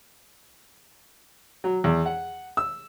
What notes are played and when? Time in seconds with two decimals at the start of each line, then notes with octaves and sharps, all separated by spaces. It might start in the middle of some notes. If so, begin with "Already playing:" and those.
1.64 F#3
1.84 E2
2.06 F#5
2.57 E6